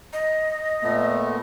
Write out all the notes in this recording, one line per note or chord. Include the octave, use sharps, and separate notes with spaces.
D#5
A#2 A3 B3